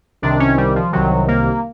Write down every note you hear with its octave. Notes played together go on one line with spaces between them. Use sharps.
C2 C3 D#3 D4
C#4
G3
F3
C2 C3 D#3 F#3
A#3